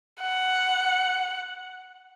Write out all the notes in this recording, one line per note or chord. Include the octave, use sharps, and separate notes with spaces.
F#5